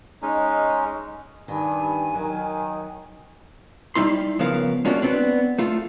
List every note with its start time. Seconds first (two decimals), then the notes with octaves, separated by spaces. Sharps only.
0.22 G#3 C#4 D#4
1.48 G2 D#3 G#5
2.14 D#3 F#3
3.95 G3 D#4 E4 C6
4.39 C#3 F3 B3 A#4 F5
4.85 G#3 A#3 C#4 D4 F4 F#4
5.02 B3 C4 D4
5.58 A3 F4